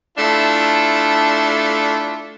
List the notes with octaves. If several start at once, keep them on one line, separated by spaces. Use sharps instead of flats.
A3 D4 E4 F4